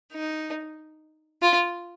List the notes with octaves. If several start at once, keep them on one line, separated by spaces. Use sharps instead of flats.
D#4
F4